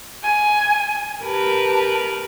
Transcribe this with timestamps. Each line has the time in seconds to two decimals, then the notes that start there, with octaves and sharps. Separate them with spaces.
0.23 G#5
1.24 G4 A#4 B4 A5